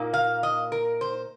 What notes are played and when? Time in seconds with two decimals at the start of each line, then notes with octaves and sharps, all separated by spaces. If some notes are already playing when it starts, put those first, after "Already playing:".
Already playing: A#2 A#3 D#4
0.14 F5
0.43 D#5
0.72 A#4
1.01 C5